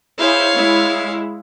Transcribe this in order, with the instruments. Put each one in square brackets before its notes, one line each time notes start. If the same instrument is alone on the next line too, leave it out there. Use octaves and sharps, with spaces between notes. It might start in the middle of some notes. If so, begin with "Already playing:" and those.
[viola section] E4 G#4 C5 [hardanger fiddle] C#5 F5
[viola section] G#3 E4